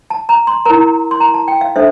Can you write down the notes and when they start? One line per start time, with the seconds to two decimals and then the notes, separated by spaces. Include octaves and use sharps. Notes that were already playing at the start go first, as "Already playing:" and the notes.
0.10 A5
0.29 A#5
0.47 C6
0.65 E4 A#4 A#5
1.11 C6
1.20 A#5
1.34 A5
1.48 G5
1.61 F5
1.76 D4 A4 C5 E5